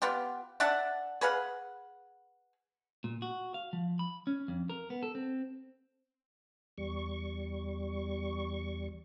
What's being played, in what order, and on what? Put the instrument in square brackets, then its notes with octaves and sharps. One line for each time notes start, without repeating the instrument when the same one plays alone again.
[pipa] B3 F4 G4
D4 E5 F#5 A5
G#4 B4 F5 F#5
[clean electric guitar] A#2
F#4
F5
F3
B5
C#4
F2
A#4
B3
A4
C4
[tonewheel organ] E2 G3 C#6